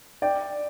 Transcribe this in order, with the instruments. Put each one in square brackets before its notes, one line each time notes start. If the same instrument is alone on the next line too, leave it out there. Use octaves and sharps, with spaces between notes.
[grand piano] D5 G5